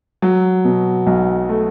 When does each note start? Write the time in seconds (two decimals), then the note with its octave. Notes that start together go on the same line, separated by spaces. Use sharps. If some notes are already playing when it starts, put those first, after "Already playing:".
0.22 F#3
0.65 B2
1.07 B1
1.49 A3